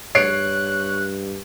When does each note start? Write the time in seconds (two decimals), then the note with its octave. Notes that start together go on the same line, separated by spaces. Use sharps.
0.15 G2 C#5 F#6 C7 D7